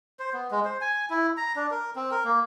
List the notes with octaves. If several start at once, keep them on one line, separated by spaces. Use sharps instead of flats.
C5
B3
G#3
C5
G#5
E4
A#5
D4
A#4
C4
A#4
A#3